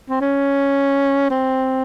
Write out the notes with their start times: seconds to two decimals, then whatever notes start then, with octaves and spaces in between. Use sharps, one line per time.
0.10 C4
0.21 C#4
1.30 C4